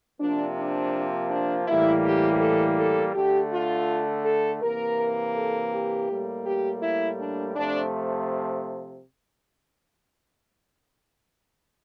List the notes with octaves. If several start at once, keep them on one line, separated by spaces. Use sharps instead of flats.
C3 F3 A#3 D4
D4
D4
A2 E3 G3 A#3 E4
G4
A4
A4
D3 A3 G4
F4
A4
C3 E3 A#3 A#4
A4
G4
A2 G3 A#3
G4
E4
D4
C3 F3 A3 D4